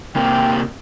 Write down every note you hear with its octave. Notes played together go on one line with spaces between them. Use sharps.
C3 A#3 G5